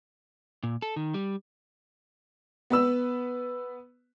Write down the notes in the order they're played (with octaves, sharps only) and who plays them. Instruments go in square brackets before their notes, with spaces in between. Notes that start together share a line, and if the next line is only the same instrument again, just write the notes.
[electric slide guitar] A#2
A4
D#3
G3
[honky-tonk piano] B3 B4 E6